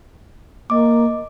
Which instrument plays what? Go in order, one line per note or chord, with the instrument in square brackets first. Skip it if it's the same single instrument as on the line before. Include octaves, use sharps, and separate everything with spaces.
[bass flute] A#3 [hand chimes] D#5 D6